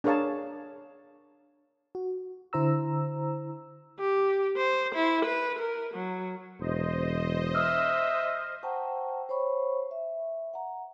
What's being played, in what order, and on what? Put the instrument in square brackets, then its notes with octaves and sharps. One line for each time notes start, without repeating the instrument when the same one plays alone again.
[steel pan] D4 G#4 A#4 C#5 F5 A5
[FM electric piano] F#4
D3 E4 C5 A#5 E6
[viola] G4
C5
E4
B4
A#4
F#3
[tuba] E1 [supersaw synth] C5 D#5
[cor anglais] E5 [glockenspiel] D#6 F6
[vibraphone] C5 F#5 G5 A5 A#5 C#6
C5 C#5 B5 C#6
E5
F#5 A#5